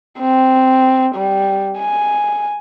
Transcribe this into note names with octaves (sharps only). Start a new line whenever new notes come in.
C4
G3
G#5